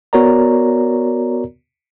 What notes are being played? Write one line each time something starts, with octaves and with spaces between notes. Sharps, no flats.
B3 F#4 A#4 C#5 D5 A#5